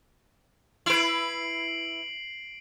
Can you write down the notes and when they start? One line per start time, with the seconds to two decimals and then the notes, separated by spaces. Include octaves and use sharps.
0.86 E4 B4 C7 D7 F#7